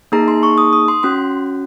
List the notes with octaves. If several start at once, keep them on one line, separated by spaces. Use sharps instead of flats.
A#3 D#4 G#4 A#5
C6
C#6
D#6
D#6
C6
C#4 F#4 C6